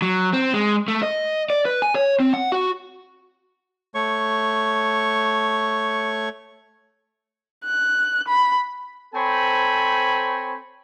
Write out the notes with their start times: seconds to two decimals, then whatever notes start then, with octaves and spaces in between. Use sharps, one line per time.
0.02 F#3
0.33 C4
0.54 G#3
0.88 A3
1.03 D#5
1.50 D5
1.65 B4
1.82 G#5
1.95 C#5
2.20 C4
2.34 F#5
2.52 F#4
3.95 A3 C#5 C#6
7.65 F#6
8.28 B5
9.15 C4 A4 C5 C#5 G#5 B5